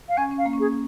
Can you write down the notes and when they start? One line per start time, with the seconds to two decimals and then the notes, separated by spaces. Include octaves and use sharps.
0.09 F5
0.17 C#4 G#5
0.31 C#4
0.38 F5
0.46 A#3
0.53 C#4
0.58 A#3 G#4